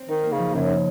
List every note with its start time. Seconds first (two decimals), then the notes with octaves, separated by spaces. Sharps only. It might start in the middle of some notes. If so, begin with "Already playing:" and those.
Already playing: C4
0.08 D#3 D#4
0.23 A#3
0.32 C#3
0.39 F3
0.54 F#2 C#3
0.69 D#4